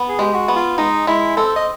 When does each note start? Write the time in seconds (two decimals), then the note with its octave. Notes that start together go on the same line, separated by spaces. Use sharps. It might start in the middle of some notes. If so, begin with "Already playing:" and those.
Already playing: B3
0.08 G#4
0.19 G#3 G4
0.34 F#4
0.48 B3
0.56 F4
0.78 G#3 D#4
1.07 G#3 E4
1.37 C4 A4
1.56 D#5